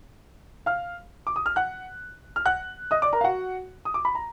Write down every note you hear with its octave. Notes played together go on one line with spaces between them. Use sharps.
F5 F6
D6
D#6
F6
F#5 F#6
F6
F#5 F#6
D#5 D#6
D5 D6
A#4 A#5
F5
F#4 F#5
D#6
D6
B5
A#5